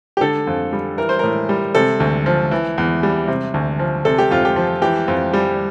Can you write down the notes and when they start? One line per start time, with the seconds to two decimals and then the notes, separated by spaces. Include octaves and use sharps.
0.17 G4
0.21 D3 A4
0.47 F2
0.73 G3
0.98 E3 A#4
1.09 C5
1.19 A2 A#4
1.49 G3
1.75 C3 A4
2.00 D2
2.26 F3
2.51 E3
2.78 E2
3.03 G3
3.28 C3
3.54 D2
3.79 F3
4.05 C3 A4
4.18 G4
4.31 F2 F4
4.45 G4
4.56 F3
4.82 E3 G4
5.08 F2
5.34 G3